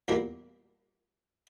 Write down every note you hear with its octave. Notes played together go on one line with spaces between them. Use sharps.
E2 A#2 G3 A#3